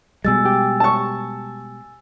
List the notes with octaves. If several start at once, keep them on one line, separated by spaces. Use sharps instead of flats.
B2 G3 G#3 G#5 E6 A6
G4
A5 C#6